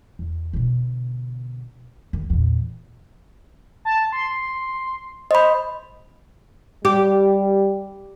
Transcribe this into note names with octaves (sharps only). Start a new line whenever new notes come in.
E2
B2 D3
D#2
E2 A#2
A5
C6
C5 D#5 B5
G3 G4